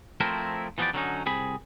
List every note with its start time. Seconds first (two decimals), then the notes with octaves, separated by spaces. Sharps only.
0.20 F3 A3 C4 E4 A#4 E5
0.78 E3 F3 B3 F4 G4 D5
0.93 D3 F#3 A#3 C4 C#4 D#4
1.26 C2 C4 G#4 B5